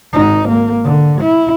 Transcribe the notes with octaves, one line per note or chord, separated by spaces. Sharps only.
G#1 D#4
A#3
D3
E4